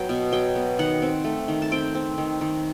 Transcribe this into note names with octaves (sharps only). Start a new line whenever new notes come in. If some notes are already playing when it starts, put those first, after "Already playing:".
Already playing: F#3 B3 G5
B2
F#3 G5
B3
D#3 F#5
C4
A3
D#3
A5
C4 G5
C4
D#3
D#3